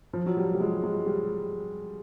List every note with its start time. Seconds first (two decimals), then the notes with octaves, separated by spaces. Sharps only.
0.13 F3
0.26 F#3
0.37 G3
0.55 G3
0.60 G#3
0.83 G#3
1.06 G3